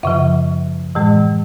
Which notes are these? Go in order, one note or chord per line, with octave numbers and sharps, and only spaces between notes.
F#2 C#3 F3 E5
A2 E3 G#3